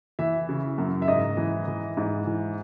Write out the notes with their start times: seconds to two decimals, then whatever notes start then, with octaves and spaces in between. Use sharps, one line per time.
0.19 E3 E5
0.49 C#3
0.78 F#2
1.02 E5
1.08 G#2 D#5
1.37 E3
1.68 E3
1.97 G#2
2.26 E3